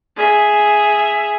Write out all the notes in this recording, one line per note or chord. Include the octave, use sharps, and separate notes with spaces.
G#4 E5